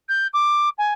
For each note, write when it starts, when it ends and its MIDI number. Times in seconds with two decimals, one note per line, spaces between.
0.09 0.27 91
0.33 0.69 86
0.78 0.93 80